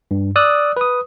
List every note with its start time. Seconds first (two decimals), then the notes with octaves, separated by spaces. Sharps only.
0.11 G2
0.36 D5 D#6 E6 F#6
0.77 B4 D#6